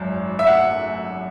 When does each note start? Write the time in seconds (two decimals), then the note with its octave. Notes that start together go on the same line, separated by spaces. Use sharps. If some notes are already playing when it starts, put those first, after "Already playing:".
Already playing: G#1 F#2
0.39 E5
0.47 F#5